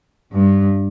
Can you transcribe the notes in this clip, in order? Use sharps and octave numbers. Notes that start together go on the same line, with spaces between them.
G2